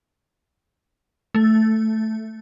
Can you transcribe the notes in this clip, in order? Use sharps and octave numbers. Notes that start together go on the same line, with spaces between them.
A3